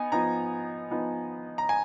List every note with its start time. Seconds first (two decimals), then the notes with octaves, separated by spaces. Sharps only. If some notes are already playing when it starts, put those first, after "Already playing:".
Already playing: B3 D#4 G#5
0.12 F3 B3 D#4 A#5
0.91 F3 B3 D#4
1.58 A#5
1.69 G#5